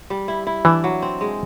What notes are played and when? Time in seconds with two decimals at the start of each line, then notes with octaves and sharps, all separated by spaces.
0.10 G3
0.28 E4
0.47 E4
0.65 E3 D4
0.84 F#3
1.02 C4
1.21 G#3